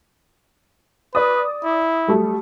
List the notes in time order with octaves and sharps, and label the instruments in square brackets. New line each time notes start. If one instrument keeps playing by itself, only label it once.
[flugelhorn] B4 [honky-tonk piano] D5 D#6
[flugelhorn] E4
[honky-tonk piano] F#3 G3 A3